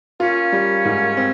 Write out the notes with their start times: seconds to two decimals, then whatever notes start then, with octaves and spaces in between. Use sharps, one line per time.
0.20 A#3 C#4 F4
0.52 G3
0.85 G#2
1.17 C4